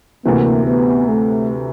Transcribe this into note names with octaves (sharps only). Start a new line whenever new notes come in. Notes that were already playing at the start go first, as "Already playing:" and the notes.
D2 C3 E3 A#3
B3
A3